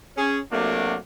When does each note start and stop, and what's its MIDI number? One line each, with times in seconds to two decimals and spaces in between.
0.17 0.39 61
0.17 0.39 68
0.52 0.96 48
0.52 0.96 54
0.52 0.96 57
0.52 0.96 58
0.52 0.96 62
0.52 0.96 66